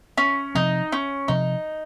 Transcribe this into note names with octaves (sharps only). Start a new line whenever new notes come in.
C#4
C3 F3 C4 D#4
C#4
C3 F3 C4 D#4